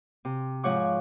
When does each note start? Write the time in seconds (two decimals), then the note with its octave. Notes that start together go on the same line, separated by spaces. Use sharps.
0.25 C3
0.64 G#2 F3 C#5 F#5 D6